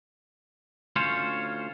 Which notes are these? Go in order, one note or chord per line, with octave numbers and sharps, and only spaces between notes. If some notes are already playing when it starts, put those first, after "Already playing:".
D2 C#4 F4 C5 C#5